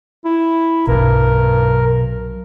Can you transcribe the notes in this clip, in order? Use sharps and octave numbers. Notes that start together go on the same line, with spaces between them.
E4
B1 G2 B2 F#3 A#4